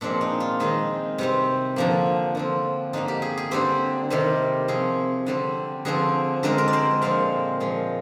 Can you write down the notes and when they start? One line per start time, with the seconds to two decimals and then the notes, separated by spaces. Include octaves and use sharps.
0.01 A#2 F3 G#3 C4 D4
0.21 D#4
0.40 F4
0.60 D#3 G#3 C4 D#4
1.18 C3 G3 C4
1.76 D3 F3 A#3
2.35 D3 F3 C4
2.93 D3 G3 A#3 D#4
3.08 G4
3.22 G#4
3.37 G#4
3.51 D3 G3 C4 G4
4.10 C3 D#3 G3 C4
4.68 C3 F3 C4 G#4
5.26 D3 G3 C4
5.85 D3 F3 C4 G#4
6.43 D3 G#3 C4 A#4
6.58 A#4
6.68 D5
6.73 C5
7.02 A#2 F3 G#3 C4 F5
7.60 A#2 F3 G#3